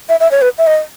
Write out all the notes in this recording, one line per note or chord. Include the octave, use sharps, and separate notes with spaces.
E5
E5
C#5
B4
E5
D#5